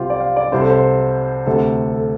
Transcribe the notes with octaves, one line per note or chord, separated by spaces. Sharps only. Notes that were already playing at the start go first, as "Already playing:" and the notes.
Already playing: C2 C3 F4 G4 C5
D5
F5
D5
C2 C3 C5
A4
C5
D2 C3 A4
A4